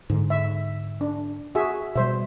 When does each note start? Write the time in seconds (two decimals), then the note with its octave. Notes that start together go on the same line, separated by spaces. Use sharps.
0.10 G#2 D3
0.30 E5
1.01 D4
1.55 F#4 G#4 E5
1.95 B2 G3 C5 E5